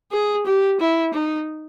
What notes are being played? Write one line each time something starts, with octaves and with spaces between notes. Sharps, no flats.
G#4
G4
E4
D#4